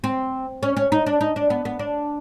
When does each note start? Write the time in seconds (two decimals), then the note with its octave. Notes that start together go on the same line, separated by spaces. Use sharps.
0.04 C4
0.63 C#4
0.77 C#4
0.92 D#4
1.06 D4
1.21 D#4
1.36 D4
1.50 B3
1.65 B3
1.79 D4